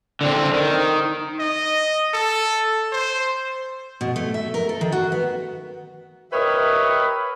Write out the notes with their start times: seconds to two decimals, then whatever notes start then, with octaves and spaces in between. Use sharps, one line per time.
0.21 D3 C4
0.53 D#3
1.40 D#5
2.14 A4
2.92 C5
4.01 B2
4.16 A3
4.34 E5
4.54 A#4
4.69 A4
4.81 D#3
4.92 F#4
5.12 B3
6.33 G4 A#4 B4 C#5 D#5 E5